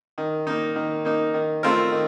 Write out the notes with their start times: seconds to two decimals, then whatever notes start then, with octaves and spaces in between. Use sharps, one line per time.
0.18 D#3
0.47 A#3 D#4
0.76 D#3
1.05 A#3 D#4
1.34 D#3
1.63 A3 C4 F4 A#4
1.92 D#3